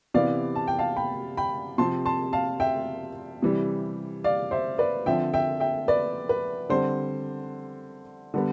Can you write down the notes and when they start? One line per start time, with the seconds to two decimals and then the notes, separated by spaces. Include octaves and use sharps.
0.14 C3 E3 B3 D5 F5
0.56 A5
0.67 G5
0.79 F5 A5
0.96 G5 B5
1.37 G5 B5
1.78 C3 F3 C4 A5 C6
2.06 A5 C6
2.33 F5 A5
2.60 E5 G5
3.42 C3 E3 G3
4.24 D5 F5
4.51 C5 E5
4.78 B4 D5
5.06 D3 F3 C4 E5 G5
5.33 E5 G5
5.60 E5 G5
5.88 B4 D5
6.29 B4
6.69 D3 G3 C4 C5
8.34 D3 G3 B3